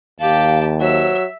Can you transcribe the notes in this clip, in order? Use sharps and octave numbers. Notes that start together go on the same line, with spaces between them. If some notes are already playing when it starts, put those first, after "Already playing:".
D#2 G4 F5 A5
F#3 C5 E5 E6